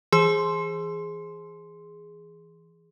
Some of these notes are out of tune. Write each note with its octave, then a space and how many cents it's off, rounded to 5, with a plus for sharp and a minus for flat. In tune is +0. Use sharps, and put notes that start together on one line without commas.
E3 +0 G#4 +0 C6 +0